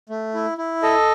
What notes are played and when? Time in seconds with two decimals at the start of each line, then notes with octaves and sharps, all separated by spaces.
0.09 A3
0.34 E4
0.58 E4
0.83 A4 D#5